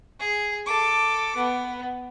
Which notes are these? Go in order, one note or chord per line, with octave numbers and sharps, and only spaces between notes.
G#4
A4 D6
B3